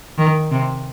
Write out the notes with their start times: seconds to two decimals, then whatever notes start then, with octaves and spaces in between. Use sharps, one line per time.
0.18 D#3
0.51 C3